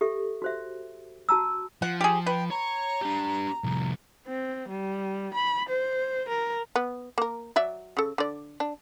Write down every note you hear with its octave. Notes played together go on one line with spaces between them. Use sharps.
G4 A4 E5
F#4 C5 E5
F#4 A5 A#5 E6
F3 F#5
G4 G#4
B4 G5
C#5 A#5
D4 G4
C2 F3
C4
G3
B5
C5
A#4
B3
A#3 A#4
F#3 D5 E5
C#3 A4
D3 D5
D4